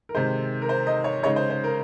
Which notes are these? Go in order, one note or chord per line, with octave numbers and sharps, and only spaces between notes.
A#4
C3 D#3 G#3 C5
A#4
C5
D#5
C#5
C#3 G#3 D#4 C#5
C5
C5
A#4